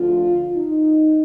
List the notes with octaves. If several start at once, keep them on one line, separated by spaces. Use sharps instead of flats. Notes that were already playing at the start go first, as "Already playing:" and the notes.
Already playing: D2 D3 F3 F4
D#4